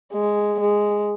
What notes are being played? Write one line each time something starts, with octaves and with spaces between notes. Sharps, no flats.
G#3
G#3